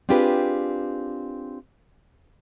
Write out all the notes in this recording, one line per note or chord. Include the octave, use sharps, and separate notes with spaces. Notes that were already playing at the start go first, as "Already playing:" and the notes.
C4 D4 F4 G4 G#4 B4